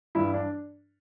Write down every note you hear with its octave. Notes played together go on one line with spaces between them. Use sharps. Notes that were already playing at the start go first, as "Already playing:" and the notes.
G2 E3 E4
D4